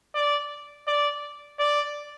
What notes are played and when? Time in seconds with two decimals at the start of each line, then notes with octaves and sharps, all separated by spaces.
0.15 D5
0.87 D5
1.59 D5